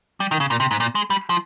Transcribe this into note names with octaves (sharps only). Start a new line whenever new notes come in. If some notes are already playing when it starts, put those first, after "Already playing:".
G3
D#3
C#3
A#2
C3
G#2
A#2
G#3
G3
F3